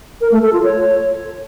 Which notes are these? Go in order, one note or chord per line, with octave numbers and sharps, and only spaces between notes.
A#4
A3
A4
F4
C#5